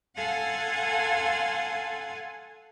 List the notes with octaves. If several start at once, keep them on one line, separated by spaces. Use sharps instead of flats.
A4 F5 F#5 G#5 C6 G#6